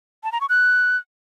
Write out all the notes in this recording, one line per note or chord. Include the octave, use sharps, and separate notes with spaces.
A5
A#5
C#6
F#6